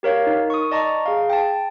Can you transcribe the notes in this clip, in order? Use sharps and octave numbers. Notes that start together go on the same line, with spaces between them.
G4 A#4 C#5 F5
D#4 A#4
C#6 D#6
D5 D#5 A5 A#5 C#6
G#4 F5
G5 A5